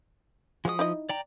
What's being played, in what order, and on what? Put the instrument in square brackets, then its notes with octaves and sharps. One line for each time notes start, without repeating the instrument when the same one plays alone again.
[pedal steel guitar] F3 D#6 [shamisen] G#3 F#4
[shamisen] D#4 E4 D#5
[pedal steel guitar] D5 G5 A#5